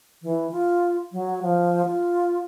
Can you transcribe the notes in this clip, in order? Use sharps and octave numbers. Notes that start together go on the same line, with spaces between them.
E3
F4
F#3
F3
F4